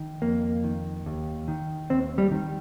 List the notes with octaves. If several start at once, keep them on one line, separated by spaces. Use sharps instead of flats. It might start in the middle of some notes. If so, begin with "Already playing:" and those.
Already playing: D#3
F2 A#3
D#3
D#2
D#3
D#2 C4
G3
D#3